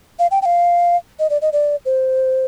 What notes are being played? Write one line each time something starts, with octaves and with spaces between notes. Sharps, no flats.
F5
G5
G5
F5
D#5
D5
D#5
D5
C5